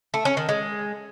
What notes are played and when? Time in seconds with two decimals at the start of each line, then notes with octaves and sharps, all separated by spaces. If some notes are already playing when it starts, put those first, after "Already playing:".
0.14 A3
0.25 C#4
0.37 D#3
0.49 G#3